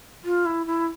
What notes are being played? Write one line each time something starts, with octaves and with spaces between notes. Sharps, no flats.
F4
E4
E4